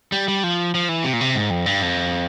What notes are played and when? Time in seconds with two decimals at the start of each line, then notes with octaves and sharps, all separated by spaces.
0.12 G3
0.28 G3
0.44 F3
0.75 F3
0.89 E3
1.04 C3
1.13 A#2
1.21 C3
1.36 G#2
1.50 F2
1.66 G2
1.82 F2